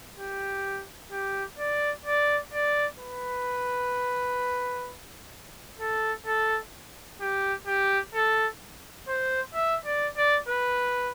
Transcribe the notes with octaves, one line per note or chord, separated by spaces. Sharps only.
G4
G4
D5
D5
D5
B4
A4
A4
G4
G4
A4
C5
E5
D5
D5
B4